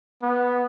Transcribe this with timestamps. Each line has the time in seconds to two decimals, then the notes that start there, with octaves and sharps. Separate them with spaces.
0.22 B3